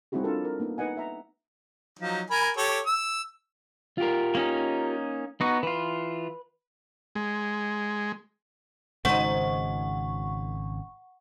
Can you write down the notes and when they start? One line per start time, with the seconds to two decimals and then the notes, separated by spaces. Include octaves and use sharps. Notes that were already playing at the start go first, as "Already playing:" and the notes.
0.12 G3 C4 D#4 E4 F#4 G#4
0.24 D4 F4 A4 A#4
0.45 A#4
0.60 A#3 B3 D#4
0.78 D#4 B4 D#5 F#5 G#5
0.97 E5 A#5
1.99 F3 F#3 D#4
2.30 A#4 G#5 B5
2.57 G4 A4 C#5
2.86 E6
3.98 F4 G4 A#4
4.35 A#3 C#4 D#4
5.41 B3 D#4 F#4
5.63 E3 F4 B4
7.16 G#3
9.05 G#1 C#3 G#3 D#4 C5 F#5 C#6